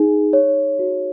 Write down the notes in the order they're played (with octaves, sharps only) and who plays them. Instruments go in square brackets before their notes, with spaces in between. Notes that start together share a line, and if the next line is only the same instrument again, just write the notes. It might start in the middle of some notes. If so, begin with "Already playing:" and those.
Already playing: [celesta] D#4 G#4
C#5
F#4